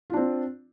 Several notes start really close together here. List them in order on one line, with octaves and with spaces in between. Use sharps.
F4 D4 C4